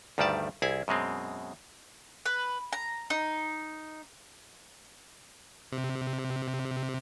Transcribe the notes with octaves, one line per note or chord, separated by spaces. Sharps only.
D2 G2 D#3 G3 D5 A5
C2 E4 G#4 G#5
F#2 B2 G#3 C4
B4
A#5
D#4
C3